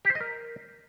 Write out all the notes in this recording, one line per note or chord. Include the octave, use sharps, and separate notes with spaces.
G4
C5
D#5
A#4